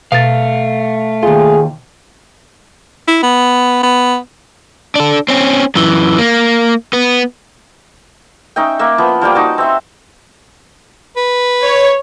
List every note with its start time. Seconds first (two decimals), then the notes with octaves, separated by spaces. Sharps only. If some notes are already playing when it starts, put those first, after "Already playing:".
0.12 B2 A3 F5 A6
1.23 D#2 F4 G#4
3.08 E4
3.23 B3
3.83 B3
4.95 D4 A4
5.28 C4 C#4
5.75 F#2 E3
6.18 A#3
6.93 B3
8.56 C#4 D#4 E5 G5
8.79 A#3 E5
8.98 F3 B3
9.21 F3 G3 A#3 G5
9.35 D#4 F#4 A5
9.58 C4 E5 C6
11.16 B4
11.62 C#5